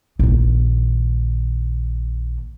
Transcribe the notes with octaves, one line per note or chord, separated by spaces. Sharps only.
A#1 D#3